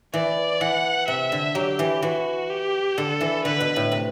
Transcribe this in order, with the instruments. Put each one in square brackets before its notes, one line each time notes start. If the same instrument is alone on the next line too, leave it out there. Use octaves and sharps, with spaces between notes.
[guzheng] E3 [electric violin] D5
[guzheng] E3 [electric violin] F#5
[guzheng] C3 [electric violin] E5
[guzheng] D3
[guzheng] F#3 [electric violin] G4
[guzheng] E3
[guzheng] E3 [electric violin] F#4
[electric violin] G4
[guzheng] D3 [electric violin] A4
[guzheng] E3
[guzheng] D3 [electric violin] B4
[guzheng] B2
A2
C3